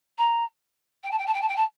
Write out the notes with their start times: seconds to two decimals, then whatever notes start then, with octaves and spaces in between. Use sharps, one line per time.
0.18 A#5
1.04 G5
1.11 A5
1.19 G5
1.27 A5
1.34 G5
1.41 A5
1.49 G5
1.57 A5